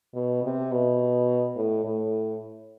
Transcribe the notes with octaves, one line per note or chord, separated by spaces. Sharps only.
B2
C3
B2
A2
A2